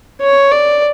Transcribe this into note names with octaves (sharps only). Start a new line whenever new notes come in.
C#5
D5